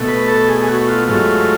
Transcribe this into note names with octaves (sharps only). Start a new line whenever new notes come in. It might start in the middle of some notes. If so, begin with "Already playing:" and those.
Already playing: B2 A3
B4
A4
G#4
G#4
F#4
F4
G#2 F#3 A3 F4